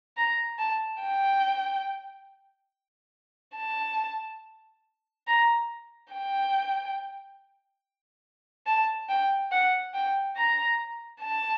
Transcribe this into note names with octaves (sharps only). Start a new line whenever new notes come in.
A#5
A5
G5
A5
A#5
G5
A5
G5
F#5
G5
A#5
A5